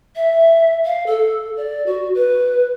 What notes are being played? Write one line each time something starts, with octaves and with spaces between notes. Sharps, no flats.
E5
F5
A4
D5
F#4
B4